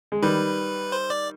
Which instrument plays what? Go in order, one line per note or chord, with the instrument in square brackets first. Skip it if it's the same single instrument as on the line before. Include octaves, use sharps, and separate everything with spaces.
[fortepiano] G#3
[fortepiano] D#3 G3 [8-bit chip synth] B4
[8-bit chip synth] C5
D5